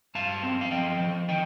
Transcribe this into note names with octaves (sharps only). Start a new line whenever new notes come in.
G2 F5 A5
C4
F5
F3 D#5 G5
F3
D#3 D#5 G5